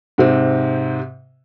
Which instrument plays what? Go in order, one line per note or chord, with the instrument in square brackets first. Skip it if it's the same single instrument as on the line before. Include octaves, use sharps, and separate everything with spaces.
[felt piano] G#2 C3 C4